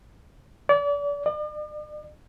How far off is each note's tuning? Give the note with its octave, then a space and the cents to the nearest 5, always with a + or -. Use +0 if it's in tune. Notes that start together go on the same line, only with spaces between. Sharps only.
D5 -35
D5 +45